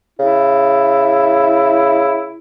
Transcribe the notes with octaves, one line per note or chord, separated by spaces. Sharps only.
C#3 E4